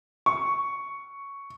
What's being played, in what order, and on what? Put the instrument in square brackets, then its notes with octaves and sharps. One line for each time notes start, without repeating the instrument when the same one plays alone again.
[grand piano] C#6